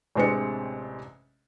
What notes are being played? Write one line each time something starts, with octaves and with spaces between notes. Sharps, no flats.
A1 C3 G#3 C4 D4 C#7